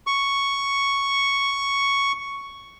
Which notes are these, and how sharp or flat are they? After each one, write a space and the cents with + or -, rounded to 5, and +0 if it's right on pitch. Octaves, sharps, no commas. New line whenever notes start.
C#6 +5